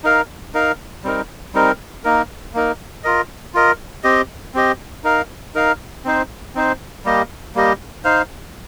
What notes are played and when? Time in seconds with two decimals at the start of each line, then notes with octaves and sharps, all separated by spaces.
0.04 D#4 A#4 F5
0.54 D#4 A#4 F5
1.04 G3 C4 D#4 A#4
1.54 G3 C4 D#4 A#4
2.04 A#3 D#4 A#4
2.54 A#3 D#4 A#4
3.04 F4 A#4 D#5
3.54 F4 A#4 D#5
4.04 C4 G4 D#5
4.54 C4 G4 D#5
5.04 D#4 A#4 F5
5.55 D#4 A#4 F5
6.05 C4 D#4 C5
6.55 C4 D#4 C5
7.04 G3 A#3 G4 D#5
7.55 G3 A#3 G4 D#5
8.04 D#4 C5 F5